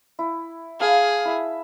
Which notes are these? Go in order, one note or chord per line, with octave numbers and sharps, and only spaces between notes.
E4
G#4 F5 A5
E4 E5